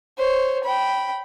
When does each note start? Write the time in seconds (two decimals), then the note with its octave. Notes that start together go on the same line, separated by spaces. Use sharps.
0.18 C5 C#5
0.64 G5 B5